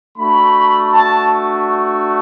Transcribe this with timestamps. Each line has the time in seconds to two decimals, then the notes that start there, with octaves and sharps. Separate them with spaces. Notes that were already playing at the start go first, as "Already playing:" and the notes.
0.17 A3 D4 F#4 B5
0.91 A5